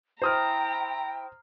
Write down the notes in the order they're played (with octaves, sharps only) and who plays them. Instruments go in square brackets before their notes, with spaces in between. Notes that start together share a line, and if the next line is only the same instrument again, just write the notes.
[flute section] E4 G5 [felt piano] C5 D#6 F6 [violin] A#5